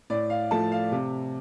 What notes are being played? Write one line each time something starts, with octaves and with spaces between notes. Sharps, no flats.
A2 D5
F5
F3 A3 A5
F5
C3